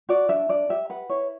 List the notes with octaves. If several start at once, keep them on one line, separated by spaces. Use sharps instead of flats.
F#4 D5
D4 E5
D4 D5
G4 E5
B4 F#5
E4 C#5